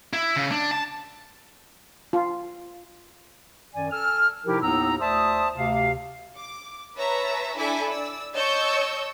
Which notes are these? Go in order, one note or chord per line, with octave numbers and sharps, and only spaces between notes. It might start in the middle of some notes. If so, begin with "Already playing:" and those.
E4
C#3
D4
A5
F4
F#2 D#3 D5 G#5
A4 G#5 E6 F6
C3 F3 D#4 E4 G4 A#4
D#2 A2 B3 D#4 A#5 E6
D2 C5 D5 E5 A5 D#6
D2 C3 F5
D6
B4 C#5 E5 A5 A#5
D4 E4 A4 E5 G#5 D6
D5 E6
C#5 D#5 A5 C#6 E6 G6